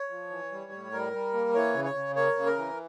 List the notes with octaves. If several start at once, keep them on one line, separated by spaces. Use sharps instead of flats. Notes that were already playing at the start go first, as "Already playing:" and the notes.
Already playing: C#5
F3
E3
G3
A2
G3 A#4
G3
A#3
E3 C#5
C#3
C#5
C#3
A#3 C#5
C#3
A#4
E3